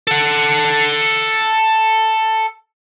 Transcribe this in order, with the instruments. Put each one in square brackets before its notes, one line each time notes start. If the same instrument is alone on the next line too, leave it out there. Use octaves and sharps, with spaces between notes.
[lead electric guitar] A4 F#5